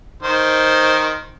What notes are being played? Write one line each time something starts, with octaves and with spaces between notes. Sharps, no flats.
D#3 C5